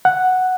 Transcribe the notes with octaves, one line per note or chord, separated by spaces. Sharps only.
F#5